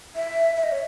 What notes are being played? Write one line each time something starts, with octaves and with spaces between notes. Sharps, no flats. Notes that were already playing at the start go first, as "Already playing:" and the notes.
E5
E5
D#5
C#5